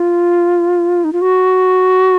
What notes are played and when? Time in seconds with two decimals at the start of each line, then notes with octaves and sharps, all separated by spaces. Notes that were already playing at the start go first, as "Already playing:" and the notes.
Already playing: F4
1.04 D#4
1.13 F4
1.21 F#4